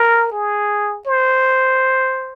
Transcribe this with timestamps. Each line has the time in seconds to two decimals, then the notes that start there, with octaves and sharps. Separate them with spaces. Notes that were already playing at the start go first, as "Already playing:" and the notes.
Already playing: A#4
0.32 G#4
1.07 C5